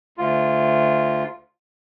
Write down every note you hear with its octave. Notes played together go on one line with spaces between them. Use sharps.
D2 F4